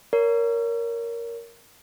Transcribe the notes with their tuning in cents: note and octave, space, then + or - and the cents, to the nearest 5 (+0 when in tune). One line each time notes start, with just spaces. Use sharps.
A#4 +0 C#5 +30